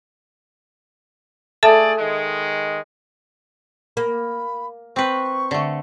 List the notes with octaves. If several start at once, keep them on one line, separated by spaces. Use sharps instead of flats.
A3 G#4 A4 D5 E5 A5
D#3 G#3
A#3 B5
C4 B4 C#6
D3 A3